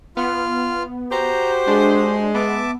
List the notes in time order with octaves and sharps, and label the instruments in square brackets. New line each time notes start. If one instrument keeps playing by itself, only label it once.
[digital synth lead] B3 [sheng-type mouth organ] F4 F6
[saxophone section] F#4 G4 C5 [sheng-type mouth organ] A#5
[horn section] G#3 [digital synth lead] D4 [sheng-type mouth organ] C6
[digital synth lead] B3 [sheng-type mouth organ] E5 A5 D6